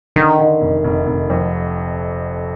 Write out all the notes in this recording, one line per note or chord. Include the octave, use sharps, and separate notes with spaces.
D3 D#3
D3
F1
F1
F1
F2